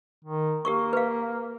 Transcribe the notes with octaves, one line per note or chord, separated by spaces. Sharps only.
D#3
A#3 G4 A#4 C#6
B4 F5